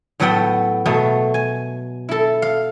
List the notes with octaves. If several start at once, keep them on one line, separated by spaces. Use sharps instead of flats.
A2 F#3 B3 F#4 A4 G5
B2 F#3 A3
G#5
E4 A4
F5